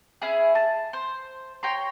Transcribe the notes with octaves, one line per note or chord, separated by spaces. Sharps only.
C#4 E4 G#4
A5
C5
C#5 G5 A#5 C6